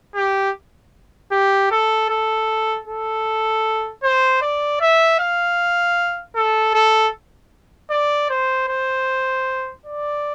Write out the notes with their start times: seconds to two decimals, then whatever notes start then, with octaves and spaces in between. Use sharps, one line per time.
0.15 G4
1.32 G4
1.71 A4
2.09 A4
2.87 A4
4.03 C5
4.42 D5
4.81 E5
5.19 F5
6.36 A4
6.74 A4
7.91 D5
8.30 C5
8.69 C5
9.86 D5